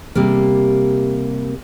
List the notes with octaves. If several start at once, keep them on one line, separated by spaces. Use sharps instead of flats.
C3 G3 A#3